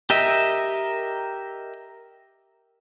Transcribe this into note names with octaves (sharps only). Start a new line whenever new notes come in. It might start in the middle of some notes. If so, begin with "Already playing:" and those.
G4 A#4 D#5 E5